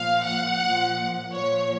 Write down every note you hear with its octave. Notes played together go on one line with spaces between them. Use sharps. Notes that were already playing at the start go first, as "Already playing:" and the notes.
Already playing: A#2 F3 F5
F#5
A#2 F3
A#2 F3 C#5